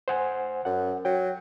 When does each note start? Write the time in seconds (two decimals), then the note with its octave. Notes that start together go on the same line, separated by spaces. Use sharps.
0.08 C5 F#5 G#5
0.65 F#2 F#5
1.05 F#3 G5